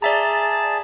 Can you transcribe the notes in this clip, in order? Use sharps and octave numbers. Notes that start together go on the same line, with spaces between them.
G#4 D5 E5 A5 A#5